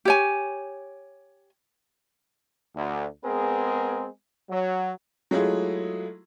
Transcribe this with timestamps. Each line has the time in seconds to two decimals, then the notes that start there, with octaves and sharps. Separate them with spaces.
0.05 G4 C#5 G#5
2.76 D2
3.24 G#3 B3 C4 G#4 A#4
4.50 F#3
5.31 F#3 G#3 A3 E4 F4 G#4